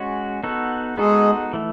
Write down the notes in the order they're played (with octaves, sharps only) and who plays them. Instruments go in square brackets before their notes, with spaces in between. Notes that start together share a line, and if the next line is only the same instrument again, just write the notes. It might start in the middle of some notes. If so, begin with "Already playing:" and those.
Already playing: [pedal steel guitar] G#3 C#4 F#4
B3 D#4 F#4 A4
[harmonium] G#3 G#4 [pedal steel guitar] B3 D#4 F#4 A4
[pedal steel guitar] E3 A3